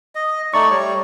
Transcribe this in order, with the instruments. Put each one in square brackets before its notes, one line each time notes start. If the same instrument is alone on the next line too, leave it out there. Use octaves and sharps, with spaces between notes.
[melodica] D#5
[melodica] A3 D#4 D5 [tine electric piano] C#6
[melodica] G3 C#5